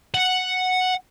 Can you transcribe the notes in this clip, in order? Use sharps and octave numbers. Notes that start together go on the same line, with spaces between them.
F#5